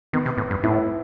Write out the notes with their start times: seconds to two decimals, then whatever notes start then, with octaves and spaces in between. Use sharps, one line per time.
0.13 D#3 B3
0.26 C3
0.38 A2
0.51 G2
0.64 A2 E4